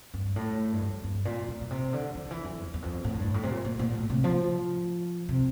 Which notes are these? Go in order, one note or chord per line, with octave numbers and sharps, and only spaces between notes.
G2
A2
G2
F2
G2
A#2
A#2
A#2
C3
D3
E3
D3
E3
F2
E2
E2
F2
A2
G2
A2
C3
A#2
A#2
A#2
A2
C3
F3
C3